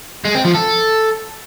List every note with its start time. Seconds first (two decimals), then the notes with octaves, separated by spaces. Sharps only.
0.25 G#3
0.35 C4
0.45 F3
0.55 A4